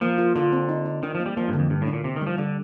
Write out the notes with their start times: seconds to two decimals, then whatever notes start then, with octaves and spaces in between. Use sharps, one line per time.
0.01 F3 A#3
0.18 F4
0.36 D3 F4
0.52 C4
0.69 D#4
0.85 D#4
1.03 D#3 D4
1.15 F3
1.20 A#3
1.26 G3
1.37 F3 A#3
1.48 G2 D3
1.59 F2
1.70 G2 D3
1.82 A2 D4
1.93 A#2
2.04 C3 G4
2.16 D#3
2.21 G3
2.27 F3
2.38 D3 G3